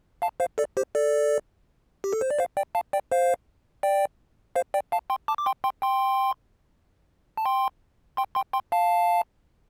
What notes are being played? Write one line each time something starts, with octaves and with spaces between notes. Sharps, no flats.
F5 A5
C5 F5
A4 D5
G4 C5
A4 D5
G4
A4
C5
D5
C5 F5
D5 G5
F5 A5
D5 G5
C5 F5
D5 G5
C5 F5
D5 G5
F5 A5
G5 C6
A5 D6
D6
G5 C6
G5 C6
G5 C6
A5
G5 C6
G5 C6
G5 C6
G5 C6
F5 A5